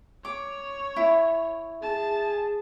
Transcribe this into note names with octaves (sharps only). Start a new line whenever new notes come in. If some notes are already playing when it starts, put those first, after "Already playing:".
C#5 D6
E4
G#4 A5